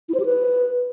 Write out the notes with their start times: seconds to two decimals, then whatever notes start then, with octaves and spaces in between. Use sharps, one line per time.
0.09 E4
0.14 C5
0.20 G4
0.25 B4